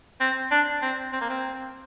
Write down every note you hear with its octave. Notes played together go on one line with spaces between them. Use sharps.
C4
D4
C4
C4
A#3
C4